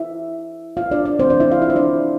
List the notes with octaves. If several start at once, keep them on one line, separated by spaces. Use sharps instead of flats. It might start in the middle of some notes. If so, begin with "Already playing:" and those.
Already playing: E4 E5
F4 F5
D4 D5
D4 D5
C3 E3 A3 C4 C5
D4 D5
E4 E5
F4 F5
E4 E5
C5
D4 D5